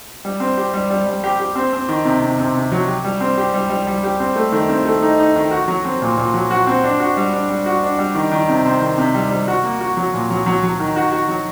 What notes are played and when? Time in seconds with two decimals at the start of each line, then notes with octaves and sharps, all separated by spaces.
0.25 G3
0.40 C4
0.58 G4
0.73 G3
0.90 G3
1.06 G3
1.24 G4
1.40 G4
1.56 C4
1.73 C4
1.88 D#3
2.05 C3
2.21 C3
2.38 C3
2.55 C3
2.72 F#3
2.88 G4
3.05 G3
3.21 C4
3.38 G4
3.54 G3
3.70 G3
3.87 G3
4.03 G4
4.20 C4
4.36 A3
4.52 D#3
4.69 C4
4.86 A3
5.02 D#4
5.19 D#4
5.36 D#3
5.51 F#4
5.68 F#3
5.85 C4
6.02 A#2
6.18 A#2
6.34 F#3
6.51 F#4
6.67 C4
6.84 D4
7.00 F#4
7.17 G3
7.33 D4
7.50 G3
7.66 F#4
7.83 D4
7.98 G3
8.15 D#3
8.31 D#3
8.49 C3
8.65 C4
8.82 D#3
8.98 C3
9.15 G3
9.30 G3
9.48 F#4
9.64 A#3
9.81 F#4
9.97 F#3
10.14 A#2
10.30 F#3
10.46 F#3
10.63 F#3
10.79 D#3
10.96 F#4
11.12 F#4
11.28 F#3